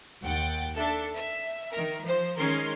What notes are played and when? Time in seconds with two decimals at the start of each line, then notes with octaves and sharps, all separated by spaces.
0.22 D#2 F#5 G5 A6
0.77 D4 A4 E5
1.15 E5
1.72 D#3 A#4
2.03 F3 C5
2.37 D#3 G#3 C#4 A#4 C6 C7